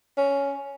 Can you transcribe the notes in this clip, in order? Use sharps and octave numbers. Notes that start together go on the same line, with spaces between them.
C#4